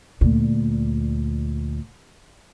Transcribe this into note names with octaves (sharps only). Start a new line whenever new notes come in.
D2 A#2